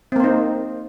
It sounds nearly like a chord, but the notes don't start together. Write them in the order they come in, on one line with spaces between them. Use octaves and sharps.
C4 A#3 C5 D#4